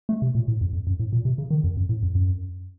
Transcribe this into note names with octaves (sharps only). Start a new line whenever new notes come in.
A3
C3
A#2
A2
F2
F2
F#2
A2
A#2
C3
C#3
D#3
F2
F#2
A2
F2
F#2